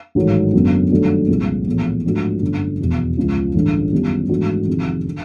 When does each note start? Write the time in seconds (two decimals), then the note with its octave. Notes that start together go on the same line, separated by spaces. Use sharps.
0.15 A1 G#2 D#3 F#3 A3
0.54 F#1 F#2 D3 F#3 B3
0.91 G2 D#3 F#3 A3 D4
1.28 C2 A#2 F3 G#3
1.66 A#1 A2 E3 G#3 B3
2.04 G#2 F3 A3 D4 F#4
2.42 G1 F#2 D3 F#3
2.79 F1 E2 B2
3.17 C#2 C#3 F3
3.55 A1 G2 D3
3.92 F#2 D#3 G3 B3
4.29 G#2 E3 A3 D4 F#4
4.67 F1 F2 C3 D#3 G#3
5.05 D3